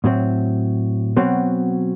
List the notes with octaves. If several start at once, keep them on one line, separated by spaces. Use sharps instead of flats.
A2 F#3 C4
B2 F#3 C4